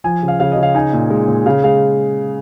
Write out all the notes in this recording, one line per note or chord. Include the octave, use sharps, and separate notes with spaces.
F3 G#5
C#3
F5
C#3 F5
C#3 D#5
F5
D#4 G#5
A#2
G#3
A#2
C#3 F5
G#3 F5